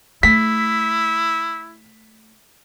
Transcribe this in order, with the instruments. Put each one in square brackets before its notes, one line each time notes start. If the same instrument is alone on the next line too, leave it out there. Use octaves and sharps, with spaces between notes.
[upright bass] A3 [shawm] E4 [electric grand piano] B6